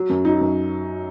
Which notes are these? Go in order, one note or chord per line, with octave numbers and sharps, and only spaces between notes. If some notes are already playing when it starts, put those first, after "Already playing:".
Already playing: F#3
F#2
F#3 D#4
F#2